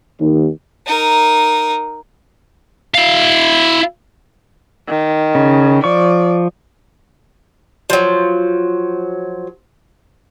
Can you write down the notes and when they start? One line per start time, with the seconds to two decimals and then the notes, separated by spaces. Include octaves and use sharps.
0.20 D#2
0.86 D#4 A#4
2.94 E4 F5
4.88 D#3
5.35 C#3
5.84 F3 D5 C#6
7.90 F3 F#3